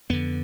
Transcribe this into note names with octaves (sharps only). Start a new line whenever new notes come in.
F2 D3 B3